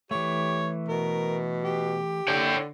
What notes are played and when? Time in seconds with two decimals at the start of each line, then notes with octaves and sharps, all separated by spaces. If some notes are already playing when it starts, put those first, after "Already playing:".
0.11 E3 A3 G4 C#5
0.88 B2 A#4
1.64 G4
2.28 D3 C#5 G5